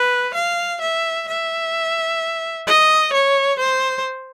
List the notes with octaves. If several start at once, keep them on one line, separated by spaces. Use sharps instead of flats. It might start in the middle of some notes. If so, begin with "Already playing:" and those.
Already playing: B4
F5
E5
E5
D#5
C#5
C5